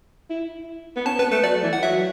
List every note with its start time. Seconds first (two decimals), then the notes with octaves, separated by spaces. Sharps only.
0.30 E4
0.96 B3
1.06 C#4 A5
1.19 B3 B4
1.31 A3 B4
1.44 F#3 D5
1.63 E3
1.73 F#5
1.83 F#3 E5